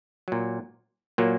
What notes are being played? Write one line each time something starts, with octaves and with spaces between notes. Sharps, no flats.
A#2 F#3
A#2 F#3 A#3